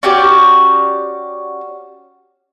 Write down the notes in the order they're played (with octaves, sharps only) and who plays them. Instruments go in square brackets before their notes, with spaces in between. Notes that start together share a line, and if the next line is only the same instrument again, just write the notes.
[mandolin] C#4 F#4 G4 D5